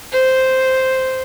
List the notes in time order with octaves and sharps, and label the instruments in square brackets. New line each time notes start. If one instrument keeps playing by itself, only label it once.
[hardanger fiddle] C5